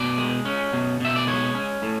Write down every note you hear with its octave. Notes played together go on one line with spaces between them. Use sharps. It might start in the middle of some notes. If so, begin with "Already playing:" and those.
Already playing: B2 D5
G#3
C#4
B2
B2 E5
D5
G#3 C#5
C#4
A2